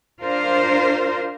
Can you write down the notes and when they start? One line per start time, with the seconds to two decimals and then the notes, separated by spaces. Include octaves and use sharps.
0.22 D4 F4 A#4 C5